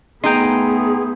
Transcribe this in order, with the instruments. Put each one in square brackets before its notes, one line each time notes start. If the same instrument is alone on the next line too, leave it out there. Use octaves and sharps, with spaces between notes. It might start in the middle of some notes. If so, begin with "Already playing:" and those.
[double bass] A3 B3 [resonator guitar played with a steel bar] D#4 [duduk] G#4 [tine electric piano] G5 C6